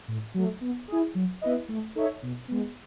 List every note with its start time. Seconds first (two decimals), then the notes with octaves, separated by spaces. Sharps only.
0.08 A2
0.34 F#3 A3
0.61 B3
0.88 E4 G#4
1.15 F#3
1.42 B3 E4 B4 D#5
1.69 A3
1.95 D#4 A4 C#5 E5
2.22 B2
2.48 G#3 B3